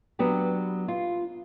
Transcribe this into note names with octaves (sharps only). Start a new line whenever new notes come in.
F#3 B3 D4 G4
F4